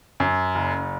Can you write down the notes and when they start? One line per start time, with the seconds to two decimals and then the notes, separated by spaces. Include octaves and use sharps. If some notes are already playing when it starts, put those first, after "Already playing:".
0.20 F#2
0.55 F#1